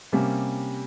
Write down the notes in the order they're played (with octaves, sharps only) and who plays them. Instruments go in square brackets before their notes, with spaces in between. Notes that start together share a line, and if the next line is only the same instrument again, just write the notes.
[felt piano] C3 G3 A#3 C#4